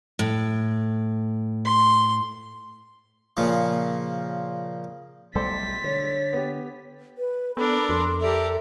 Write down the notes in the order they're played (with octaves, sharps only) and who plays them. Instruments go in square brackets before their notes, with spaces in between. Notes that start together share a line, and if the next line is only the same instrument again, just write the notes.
[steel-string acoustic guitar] A2
[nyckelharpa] C6
[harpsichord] A#2 C#3 F3
[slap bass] B1 G3 A3 [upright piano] A4 C5 D5 [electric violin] A6 B6
[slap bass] D3 [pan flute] C#5
[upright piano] B3 G4
[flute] B4
[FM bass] B3 [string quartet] D4 A#4 D5 [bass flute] A4 [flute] B5
[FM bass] F2 [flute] C6
[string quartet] G4 A#4 D5 [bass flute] A4 [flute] E5